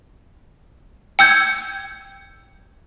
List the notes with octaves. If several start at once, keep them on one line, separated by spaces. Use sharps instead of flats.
G5 E6 G6 G#6